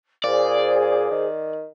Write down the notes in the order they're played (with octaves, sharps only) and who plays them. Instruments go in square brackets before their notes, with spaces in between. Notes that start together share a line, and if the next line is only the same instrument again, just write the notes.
[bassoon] A#2 [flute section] G#4 C5 [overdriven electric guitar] D5
[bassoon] D#3